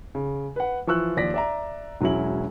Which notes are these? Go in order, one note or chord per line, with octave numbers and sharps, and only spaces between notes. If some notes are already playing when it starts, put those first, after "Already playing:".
C#3
B4 F#5
E3 F3 C#6 E6 F#6
D#2 F3 D5 A#6 B6
D5 E5 A#5
E1 F#3 G#3 C#4 E4 F#7